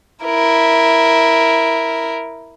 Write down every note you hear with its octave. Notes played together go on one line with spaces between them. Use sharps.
E4 A#4